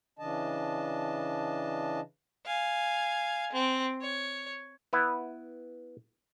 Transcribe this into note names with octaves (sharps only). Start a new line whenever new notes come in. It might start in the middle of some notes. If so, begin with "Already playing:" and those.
C#3 E3 D4 D#5 A5
F5 G#5
C4
C#5
B3 E4 B4